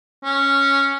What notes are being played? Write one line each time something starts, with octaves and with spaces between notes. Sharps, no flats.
C#4